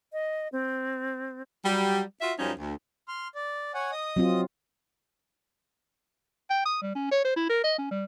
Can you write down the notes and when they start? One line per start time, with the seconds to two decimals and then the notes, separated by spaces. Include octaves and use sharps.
0.13 D#5
0.52 C4
1.64 F#3 G3
2.20 F4 F#4 E5
2.39 F#2 F3 G3 C#4 D#4
2.58 D2
3.08 C6 F6
3.35 D5
3.74 C#5 F#5 G#5
3.92 D#5 D#6
4.16 F#3 C4 F4
6.50 G5
6.65 D#6
6.82 G3
6.95 C#4
7.11 C#5
7.24 C5
7.36 E4
7.49 A#4
7.64 D#5
7.78 C#4
7.91 G3